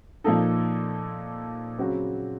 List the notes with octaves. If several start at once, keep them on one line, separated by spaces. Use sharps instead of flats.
A#2 F3 A#3 D#4 A4
C#3 F#3 C4 F#4